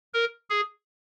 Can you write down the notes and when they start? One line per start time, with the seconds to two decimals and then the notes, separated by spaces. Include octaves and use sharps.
0.14 A#4
0.50 G#4